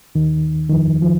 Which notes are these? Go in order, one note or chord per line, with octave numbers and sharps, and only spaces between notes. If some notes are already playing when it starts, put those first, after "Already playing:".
D#2 D#3
D#3
F2 F3
F3